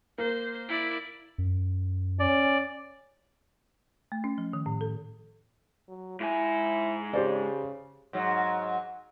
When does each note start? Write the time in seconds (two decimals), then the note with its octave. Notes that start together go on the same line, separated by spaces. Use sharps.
0.18 A#3 C5
0.69 E4 D5
1.38 F#2
2.20 C#4 D5
4.12 A3
4.24 C#4
4.38 F3
4.53 D#3
4.66 A2
4.81 A4
5.88 F#3
6.20 G#2 E4 G#5
7.13 C#3 G4 C5 D5
8.13 G#2 F#3